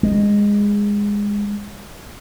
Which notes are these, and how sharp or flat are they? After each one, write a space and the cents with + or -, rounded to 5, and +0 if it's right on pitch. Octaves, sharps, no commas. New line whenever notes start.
G#3 -15